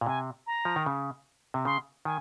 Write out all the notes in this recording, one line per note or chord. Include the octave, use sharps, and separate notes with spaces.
A#2
C3 G#5
A#5
F3
D#3
C#3
C3
C#3 C6
D#3 G#5